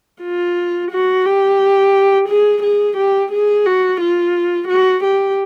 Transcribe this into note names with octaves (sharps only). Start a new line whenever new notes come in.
F4
F#4
G4
G#4
G#4
G4
G#4
F#4
F4
F#4
G4